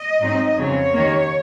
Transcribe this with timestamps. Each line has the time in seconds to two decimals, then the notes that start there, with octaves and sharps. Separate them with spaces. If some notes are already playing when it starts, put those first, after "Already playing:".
Already playing: D#5
0.21 G#2 F#3 C4 D#4
0.57 F2 C#3 F#3 C4 C#5
0.94 D#2 D#3 A#3